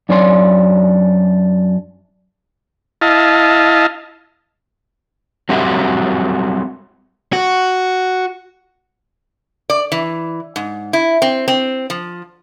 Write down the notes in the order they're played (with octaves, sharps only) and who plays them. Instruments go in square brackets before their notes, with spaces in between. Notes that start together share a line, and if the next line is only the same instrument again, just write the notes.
[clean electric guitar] F#2 D4 C#5 D5 C6
[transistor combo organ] E4 D#5 F5 A5
[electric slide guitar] F#3 G3 C4 F#4 G4 E5
[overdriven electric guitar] F#4
[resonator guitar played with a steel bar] D5
E3
G#2
E4
C4
C4
F3